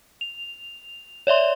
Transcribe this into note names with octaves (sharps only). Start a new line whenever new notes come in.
F7
C#5 D5 E5 C6